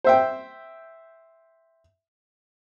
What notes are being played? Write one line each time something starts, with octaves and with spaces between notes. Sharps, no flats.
C5 E5 G5